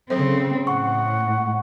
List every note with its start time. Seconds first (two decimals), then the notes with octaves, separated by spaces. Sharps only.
0.10 C#3 F#3 C4 A4 C5
0.67 A2 F#5 C#6